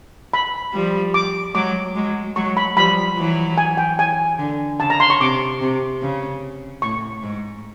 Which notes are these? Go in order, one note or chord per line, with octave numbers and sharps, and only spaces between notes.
B5
F3 G3
D6
F#3 G#3 D6
F#3 G#3
F#3 G#3 C#6
B5
F3 G3 B5
E3 F#3
G#5
G5
G#5
D3
C#3 A5
A#5
C6
C#6
C3 D6
C3
C#3
A2 C#6
G#2